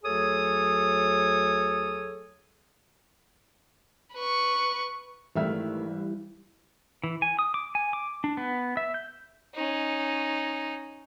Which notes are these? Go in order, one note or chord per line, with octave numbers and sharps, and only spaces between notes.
D2 F#3 G#4 A4 C#5 D#6
B4 C#6
G#1 D#3 E3 G3 A3 E4 E5 F6
E3
G#5
D#6
D6
G#5
D6
D4
B3
E5
G6
C#4 D#4